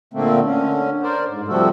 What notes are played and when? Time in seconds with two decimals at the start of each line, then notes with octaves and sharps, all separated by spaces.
0.13 A#2 D3 A3 A#3 C4
0.44 D3 C#4
1.03 A#4 C5 D5
1.28 G#2
1.48 C3 F3 G3 A3 F#4 A4